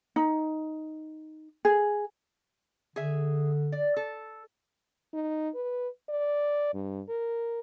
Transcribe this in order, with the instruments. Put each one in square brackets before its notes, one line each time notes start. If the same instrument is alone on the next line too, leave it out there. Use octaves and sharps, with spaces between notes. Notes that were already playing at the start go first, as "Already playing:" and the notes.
[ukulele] D#4
G#4
[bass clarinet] D3 [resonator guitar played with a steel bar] G#4 E5
[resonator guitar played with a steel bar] D5
A4
[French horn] D#4
B4
D5
G2
A#4